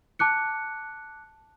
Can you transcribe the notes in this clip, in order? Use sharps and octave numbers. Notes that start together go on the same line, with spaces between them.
A5 D6 F#6 C#7